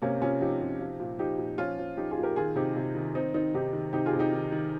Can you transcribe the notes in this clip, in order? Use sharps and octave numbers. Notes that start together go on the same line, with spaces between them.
C3 A#3 C#4
C3 C#4 F4
F3 D#4 G4
C3
F3
A#2
F3 D#4 G4
A#2
F3 C#4 F4
F3
F3 D#4 G4
F4 G#4
A#2
G4 A#4
D#3 F4 G#4
C3 D#4 G4
C3
D#3
D#3 C4 D#4
D#3 C4 D#4
C3 D#4 G4
D#3
C3 D#4 G4
F4 G#4
C3
D#4 G4
D#3
D#3